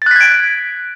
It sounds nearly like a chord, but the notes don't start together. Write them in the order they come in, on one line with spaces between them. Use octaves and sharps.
A6 F#6 B6 G#6 D7